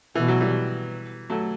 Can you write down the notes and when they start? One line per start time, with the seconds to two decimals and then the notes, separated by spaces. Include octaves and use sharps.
0.15 B2 E3
0.28 F#3
0.41 E3 G3
1.30 F#3 A3